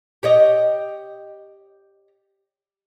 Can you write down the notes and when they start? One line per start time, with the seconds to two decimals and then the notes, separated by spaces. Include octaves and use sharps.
0.23 G4 C#5 D#5